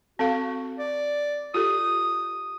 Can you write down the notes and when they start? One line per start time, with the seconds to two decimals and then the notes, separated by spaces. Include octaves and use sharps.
0.19 C4 F#4 A4 F5
0.79 D5
1.54 F4 G4 A4 D#6